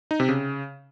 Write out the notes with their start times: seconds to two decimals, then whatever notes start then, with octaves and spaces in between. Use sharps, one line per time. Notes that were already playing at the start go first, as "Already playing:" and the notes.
0.11 D#4
0.20 C3
0.29 C#3